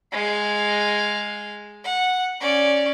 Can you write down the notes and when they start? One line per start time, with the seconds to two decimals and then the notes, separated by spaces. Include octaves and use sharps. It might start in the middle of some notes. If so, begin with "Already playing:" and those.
0.12 G#3 F5
1.84 F#5
2.41 C#4 D5